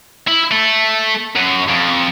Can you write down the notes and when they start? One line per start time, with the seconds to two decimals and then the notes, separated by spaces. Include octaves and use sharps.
0.27 E4
0.51 A3
1.36 F#2
1.68 F2